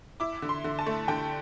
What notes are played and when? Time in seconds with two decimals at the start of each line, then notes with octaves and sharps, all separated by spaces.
0.20 E4 D6
0.42 D3
0.49 C6
0.64 D3
0.79 A5
0.86 A3
1.08 D3 G5